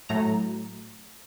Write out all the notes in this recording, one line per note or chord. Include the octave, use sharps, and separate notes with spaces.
A2 F#3 A3 A#5